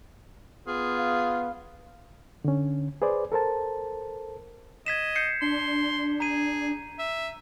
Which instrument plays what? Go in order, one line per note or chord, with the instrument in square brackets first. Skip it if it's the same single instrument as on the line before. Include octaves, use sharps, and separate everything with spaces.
[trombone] B3 [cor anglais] F4 [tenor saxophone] G#4
[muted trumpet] F5
[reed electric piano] D3 C#4
G#4 B4 C5 D5
A4 A#4 C5 A5
[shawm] D#5 [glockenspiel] G#6 B6 E7
[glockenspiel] G6 C7 C#7
[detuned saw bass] D4 [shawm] C6
[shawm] G#4 [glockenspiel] A#5 D#7
[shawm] E5